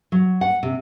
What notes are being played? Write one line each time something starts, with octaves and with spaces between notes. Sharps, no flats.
F#3
F#5
C3